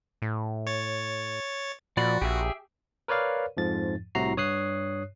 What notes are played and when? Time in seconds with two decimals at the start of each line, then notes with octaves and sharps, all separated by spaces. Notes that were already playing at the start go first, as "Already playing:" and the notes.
0.22 A2
0.67 C#5 A6
1.97 A#2 F3 F#4 D5 B5
2.22 A#1 G4 G#4 E5
3.08 A#4 B4 C#5 D5 F5
3.57 F2 G#2 F3 A6
4.15 C2 A2 C3 F#4 A#5 C7
4.37 G2 C#5 D#6 F#6 C7